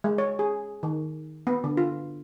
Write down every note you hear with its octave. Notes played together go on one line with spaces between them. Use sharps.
G#3
C#5
G#4
D#3
B3
D3
F4